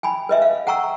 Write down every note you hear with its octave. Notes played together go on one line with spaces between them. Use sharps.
G5 G#5 B5
B4 D#5 E5
F5
F#5 G5 A#5 C#6 E6